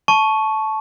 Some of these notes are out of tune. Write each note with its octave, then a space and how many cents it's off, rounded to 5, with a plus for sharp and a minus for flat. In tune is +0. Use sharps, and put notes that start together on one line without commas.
A5 -15 C#6 +0